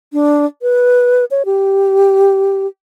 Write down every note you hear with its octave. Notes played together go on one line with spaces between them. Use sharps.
D4
B4
C#5
G4